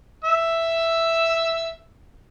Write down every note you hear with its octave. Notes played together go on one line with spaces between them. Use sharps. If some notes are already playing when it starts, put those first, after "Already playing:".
E5 E6